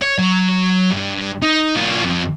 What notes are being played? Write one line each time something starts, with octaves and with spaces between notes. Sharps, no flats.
C#5
F#3
G2
D#4
B1 F4
F2